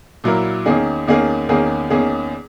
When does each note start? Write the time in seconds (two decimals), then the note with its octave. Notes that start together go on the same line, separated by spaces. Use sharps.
0.24 A#2 F#3 A#3 E4 A#4
0.66 E2 D#3 A#3 C#4 G#4
1.07 E2 D#3 A#3 C#4 G#4
1.49 E2 D#3 A#3 C#4 G#4
1.90 E2 D#3 A#3 C#4 G#4